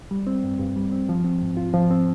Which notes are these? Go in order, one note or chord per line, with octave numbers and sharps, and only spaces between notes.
G3
C4
G2
G2
G3
C4
F3
C4
G#2
F4
F3
C4